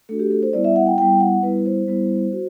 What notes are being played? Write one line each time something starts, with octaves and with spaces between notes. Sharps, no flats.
A3 D4 F#4 A4
G4
A4
C5
G3 B3 E4 D5
E5
F#5
G5
G3 B3 E4 G5
F#5
G3 B3 E4 B4
C5
G3 B3 E4
F#4